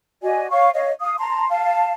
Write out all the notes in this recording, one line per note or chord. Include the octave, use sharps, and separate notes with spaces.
F#4 D5 D#5 G#5
C#5 F5 C#6
C#5 D#5 F5
F5 D#6
A5 A#5 C6
F5 A5